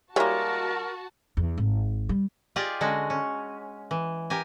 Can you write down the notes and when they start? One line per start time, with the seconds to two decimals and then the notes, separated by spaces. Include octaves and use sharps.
0.16 G3 G#3 A#3 E4 F#4 A#4 C#5 A5
1.37 E2
1.58 G#1
2.09 G3
2.56 F4 G4 G#4 D5 D#5
2.81 D3 G#3 C#4 F#4
3.10 C#4
3.91 E3
4.30 G4 A#4 G#5